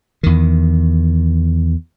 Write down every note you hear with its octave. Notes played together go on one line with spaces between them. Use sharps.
E2 D#3